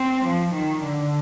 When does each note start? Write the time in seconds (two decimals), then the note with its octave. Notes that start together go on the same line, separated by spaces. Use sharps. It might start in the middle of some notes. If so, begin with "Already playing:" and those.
Already playing: C4
0.25 F3
0.54 D#3
0.84 D3